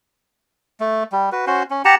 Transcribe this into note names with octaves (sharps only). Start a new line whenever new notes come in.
A3
G3
F#4 B4
C#4 F#4 C5
C#4
G4 F#5 A5 A#5